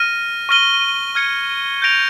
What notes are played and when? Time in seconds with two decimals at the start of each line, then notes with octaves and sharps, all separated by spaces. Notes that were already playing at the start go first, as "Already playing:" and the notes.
Already playing: F6 A#6 D#7
0.49 C#6 F6 A#6 D#7 G7
1.15 F6 G#6 C#7
1.82 G6 A#6 D7 F7